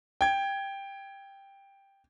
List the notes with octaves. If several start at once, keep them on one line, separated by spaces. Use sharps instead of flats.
G5 G#6